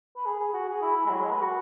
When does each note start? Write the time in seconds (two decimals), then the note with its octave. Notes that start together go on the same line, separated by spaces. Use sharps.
0.17 B4
0.26 G#4
0.40 G#4
0.54 F#4
0.68 G#4
0.82 E4
0.96 E4
1.06 G#3
1.10 F#3
1.21 G#3
1.31 B4
1.42 F#4